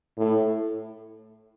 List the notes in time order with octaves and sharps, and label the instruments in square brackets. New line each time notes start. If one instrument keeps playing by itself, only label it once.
[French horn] A2